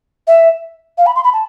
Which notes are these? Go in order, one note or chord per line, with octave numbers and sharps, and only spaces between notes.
E5
F5
B5
C6
B5
A5